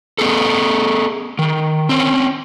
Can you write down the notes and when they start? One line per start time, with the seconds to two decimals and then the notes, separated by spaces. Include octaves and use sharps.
0.18 B3 G#4 A4
1.39 D#3
1.89 C4 C#4